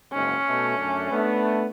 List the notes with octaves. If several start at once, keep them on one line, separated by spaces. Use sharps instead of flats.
F#1 G#2 C#4
B2 A3
F#2 A3 D4
A3 B3 D4